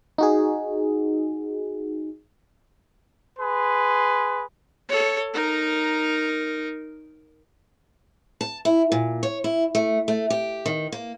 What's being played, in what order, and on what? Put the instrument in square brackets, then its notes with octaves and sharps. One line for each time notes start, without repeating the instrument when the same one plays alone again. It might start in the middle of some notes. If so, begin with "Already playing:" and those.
[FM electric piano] D#4 F#4 G#4
[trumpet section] G#4 B4 C6
[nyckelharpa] A4 C#5
D#4 A#4
[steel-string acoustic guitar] A5
E4
A#2
C#5
E4
A3
A3
G4
D#3
A#3